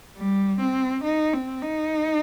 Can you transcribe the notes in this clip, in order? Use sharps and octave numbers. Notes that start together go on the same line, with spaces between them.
G3
C4
D#4
C4
D#4